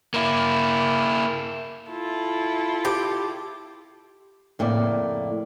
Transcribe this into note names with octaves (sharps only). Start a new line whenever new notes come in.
A#3 E4
E4 F4 A4
G4
F2 A2 C#3 A#3 D5